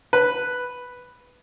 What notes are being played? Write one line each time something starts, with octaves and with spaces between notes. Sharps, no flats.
B4